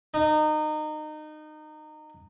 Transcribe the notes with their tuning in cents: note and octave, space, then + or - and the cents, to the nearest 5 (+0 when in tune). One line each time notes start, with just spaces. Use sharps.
D#4 -25